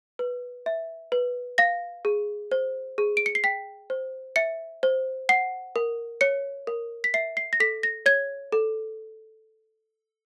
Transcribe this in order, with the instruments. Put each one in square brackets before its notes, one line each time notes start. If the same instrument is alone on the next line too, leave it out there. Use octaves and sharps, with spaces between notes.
[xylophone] B4
E5
B4
F5 A#6
G#4
C5
G#4
D7
C#7
C7
G5 B6
C5
E5 C#7
C5
F#5 C7
A#4
C#5 C#7
A#4
B6
E5 C7
C7
A#6
A4 B6
A#6
C#5 G#6
A4